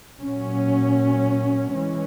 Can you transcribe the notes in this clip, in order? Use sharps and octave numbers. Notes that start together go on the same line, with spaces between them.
A#2 F#3 C#4
E3 G#3 C#4